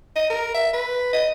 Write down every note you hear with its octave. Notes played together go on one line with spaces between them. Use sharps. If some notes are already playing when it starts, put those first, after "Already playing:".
D#5
A#4
E5
B4
D#5